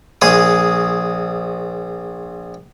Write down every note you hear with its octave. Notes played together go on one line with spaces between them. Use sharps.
A#1 G#4 D#6